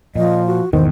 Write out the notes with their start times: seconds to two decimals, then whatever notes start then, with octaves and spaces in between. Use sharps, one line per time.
0.16 A#2 F3 D#5
0.46 F#4
0.73 G#1 E2 B2 D#3 C5